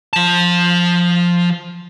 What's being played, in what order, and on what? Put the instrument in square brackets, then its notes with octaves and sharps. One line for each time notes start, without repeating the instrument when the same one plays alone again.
[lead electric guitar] F3 A5